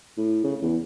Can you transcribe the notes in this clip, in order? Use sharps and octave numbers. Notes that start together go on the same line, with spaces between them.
A2
C#3
E2